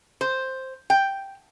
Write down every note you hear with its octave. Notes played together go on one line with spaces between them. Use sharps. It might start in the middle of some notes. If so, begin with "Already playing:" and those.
C5
G5